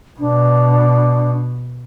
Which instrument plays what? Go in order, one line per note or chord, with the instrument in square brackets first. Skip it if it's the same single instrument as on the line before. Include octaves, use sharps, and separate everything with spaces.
[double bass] B2 [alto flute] D4